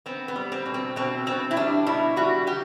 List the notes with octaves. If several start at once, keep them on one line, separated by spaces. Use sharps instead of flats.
B3 C4
B3
G3
C4
B2
C4
B2 C4
B2 C4
E4
G3 D4
B2 E4
G3 F#4
G3 G4